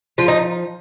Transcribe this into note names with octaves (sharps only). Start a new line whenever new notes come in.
F3 F4
D#4